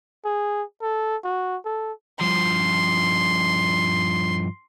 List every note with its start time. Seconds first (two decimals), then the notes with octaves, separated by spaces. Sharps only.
0.25 G#4
0.82 A4
1.24 F#4
1.65 A4
2.21 G2 F3 C6